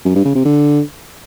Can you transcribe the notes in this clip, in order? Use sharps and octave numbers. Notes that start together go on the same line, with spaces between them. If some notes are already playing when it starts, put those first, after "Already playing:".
F#2
G2
C#3
C3
D3